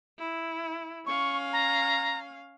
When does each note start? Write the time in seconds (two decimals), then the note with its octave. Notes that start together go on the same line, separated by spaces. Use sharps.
0.19 E4
1.06 C#4 F5 C#6
1.53 A#5